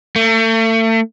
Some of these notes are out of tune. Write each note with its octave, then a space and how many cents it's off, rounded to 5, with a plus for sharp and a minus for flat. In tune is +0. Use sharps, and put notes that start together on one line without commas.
A3 +35